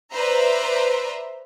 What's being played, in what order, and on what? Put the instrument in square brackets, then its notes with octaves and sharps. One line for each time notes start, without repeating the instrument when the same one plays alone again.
[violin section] B4 C5 D5 E5 A#5